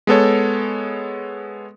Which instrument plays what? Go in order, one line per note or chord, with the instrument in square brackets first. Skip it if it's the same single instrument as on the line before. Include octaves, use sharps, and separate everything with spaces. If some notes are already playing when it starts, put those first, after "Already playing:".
[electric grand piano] G#3 B3 A4 C#5